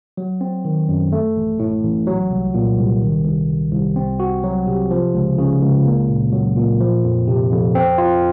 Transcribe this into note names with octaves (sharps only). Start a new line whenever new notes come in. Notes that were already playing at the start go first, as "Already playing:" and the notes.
F#3
C4
D#3
F#2
A3
A1
A2
A1
F#3
C2
A#2
C2
D#3
C2
C3
C2
C4
F#4
F#3
C3
F3
C#2
C#3
C#2
A#3
A#2
F#3
A#2
F3
F2
C3
F2
C4
F4